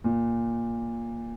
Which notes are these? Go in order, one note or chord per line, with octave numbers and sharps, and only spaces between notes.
A#2